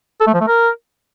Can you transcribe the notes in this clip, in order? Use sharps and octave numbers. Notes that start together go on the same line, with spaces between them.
A4
A3
F3
A3
A#4